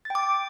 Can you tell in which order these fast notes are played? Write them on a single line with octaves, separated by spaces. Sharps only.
A6 G5 D6